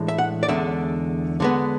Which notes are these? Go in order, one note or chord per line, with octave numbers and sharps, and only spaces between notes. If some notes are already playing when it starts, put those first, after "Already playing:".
Already playing: A2 E3 G#3 D4
E5
F#5
D5
E2 D3 G#3 C#4 E5
D3 G#3 B3